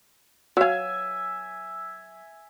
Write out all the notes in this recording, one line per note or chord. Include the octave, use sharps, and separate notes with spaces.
F#3 E5 F5 G#5